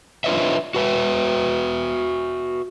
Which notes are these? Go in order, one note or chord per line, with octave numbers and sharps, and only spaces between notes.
D4 F4 B4 C#5 D#5 E5
F#4 B4 E5